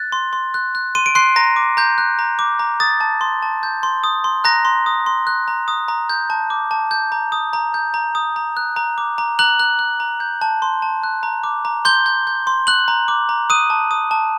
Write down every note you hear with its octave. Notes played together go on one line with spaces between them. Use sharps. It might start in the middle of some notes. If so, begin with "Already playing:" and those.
Already playing: F#6 A6
C6
C6
F#6
F#6
C6 D#7
D7
C6 F#6 C7
A#5 A#6
D6
A#5 G6
F#6
A#5
D6
A#5
D#6 A6
A5
C6
A5
G6
C6
D#6
C6
A#5 F#6 A#6
C6
D#6
C6
F#6
A#5
D#6
A#5
G6
A5
D6
A5
G6
A#5
D#6
A#5
G6
A#5
D#6
A#5
F#6
A#5
D6
A#5
A#5 F#6 F#7
F#6
F#6
A#5
G6
A5
C6
A5
F#6
A#5
D6
A#5
C6 G6 G7
G6
G6
C6
F#6 F#7
A#5
D6
A#5
D#6 F#6 D#7
A5
D#6
A5